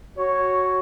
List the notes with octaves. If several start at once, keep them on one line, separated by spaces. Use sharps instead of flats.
F#4 C#5